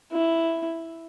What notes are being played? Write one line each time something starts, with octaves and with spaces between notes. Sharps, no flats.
E4